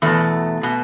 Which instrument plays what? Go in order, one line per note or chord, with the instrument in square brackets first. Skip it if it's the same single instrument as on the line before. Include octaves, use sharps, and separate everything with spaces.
[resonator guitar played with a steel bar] E2 B2 A3
B2